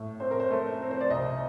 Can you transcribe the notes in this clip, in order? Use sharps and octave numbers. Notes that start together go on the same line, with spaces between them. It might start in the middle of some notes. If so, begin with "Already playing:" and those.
Already playing: A2
C4 C5
A#4
C5
A3
C4
C5
D5
C2 D#5